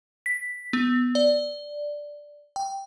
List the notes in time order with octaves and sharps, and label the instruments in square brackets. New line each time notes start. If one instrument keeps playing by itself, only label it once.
[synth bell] B6
B3
D5
G5